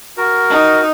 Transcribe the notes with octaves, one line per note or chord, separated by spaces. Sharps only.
F#4 A#4
D#4